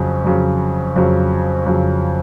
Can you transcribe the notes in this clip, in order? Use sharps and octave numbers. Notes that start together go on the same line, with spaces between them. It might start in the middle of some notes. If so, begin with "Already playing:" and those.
Already playing: F2 C#3 F#3
F2 C#3 F#3
F2 C#3 F#3
F2 C#3 F#3